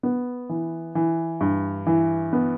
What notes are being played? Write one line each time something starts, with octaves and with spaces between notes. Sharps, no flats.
B3
E3
E3
G2
E3
B3